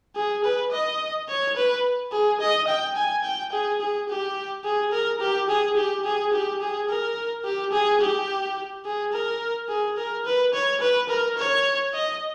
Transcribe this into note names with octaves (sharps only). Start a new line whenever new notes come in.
G#4
B4
D#5
C#5
B4
G#4
D#5
G5
G#5
G5
G#4
G#4
G4
G#4
A#4
G4
G#4
G4
G#4
G4
G#4
A#4
G4
G#4
G4
G#4
A#4
G#4
A#4
B4
C#5
B4
A#4
C#5
D#5